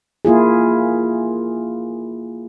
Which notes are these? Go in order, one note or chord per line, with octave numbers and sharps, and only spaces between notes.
A#3 E4 F4 G#4